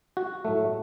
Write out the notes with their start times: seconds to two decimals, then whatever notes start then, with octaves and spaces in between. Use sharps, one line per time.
0.17 F#4
0.45 A2 F#3 A3